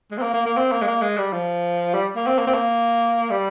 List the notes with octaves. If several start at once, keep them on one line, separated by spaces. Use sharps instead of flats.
G#3
C4
A#3
A#3
A#3
C4
A#3
G#3
A#3
G#3
G3
F3
G3
A#3
C4
A#3
C4
A#3
G3